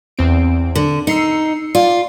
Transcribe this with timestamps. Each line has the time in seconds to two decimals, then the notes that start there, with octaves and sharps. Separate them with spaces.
0.18 E2 C4 D7
0.75 D3
1.07 D#4 E6 C7 C#7
1.75 F4 D5